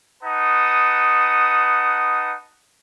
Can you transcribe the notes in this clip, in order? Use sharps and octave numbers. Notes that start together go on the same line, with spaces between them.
D#4 B4 F#5 A5 D#6